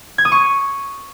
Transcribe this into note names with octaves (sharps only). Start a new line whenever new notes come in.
G#6
D#6
C#6